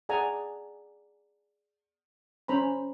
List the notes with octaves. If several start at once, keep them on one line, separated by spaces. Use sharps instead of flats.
G#4 D5 F#5 G#5 A#5
C#4 C5 A#5 B5